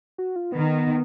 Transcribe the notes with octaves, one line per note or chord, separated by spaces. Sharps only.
F#4
F4
D#3 B3